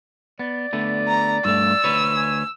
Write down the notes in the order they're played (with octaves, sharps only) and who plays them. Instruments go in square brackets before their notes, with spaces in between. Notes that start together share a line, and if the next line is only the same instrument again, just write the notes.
[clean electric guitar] B3 [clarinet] D5
[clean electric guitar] D3 A3 B3
[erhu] A#5
[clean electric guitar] G2 A3 [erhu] E6
[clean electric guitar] D2 B4 C#5
[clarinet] G#5